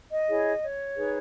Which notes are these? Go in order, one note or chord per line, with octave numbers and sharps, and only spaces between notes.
D#5
E4 G#4 C#5
C#5
D#4 G#4 B4